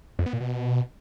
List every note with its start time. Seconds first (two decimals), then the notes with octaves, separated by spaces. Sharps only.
0.19 F2
0.26 B3
0.33 A#2
0.41 B2